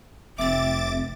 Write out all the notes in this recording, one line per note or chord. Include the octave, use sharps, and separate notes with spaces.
F1 C4 E5 D6 A6